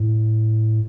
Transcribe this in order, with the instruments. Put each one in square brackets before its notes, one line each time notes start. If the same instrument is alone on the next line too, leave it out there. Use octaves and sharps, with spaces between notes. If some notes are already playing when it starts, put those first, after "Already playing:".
Already playing: [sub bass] A2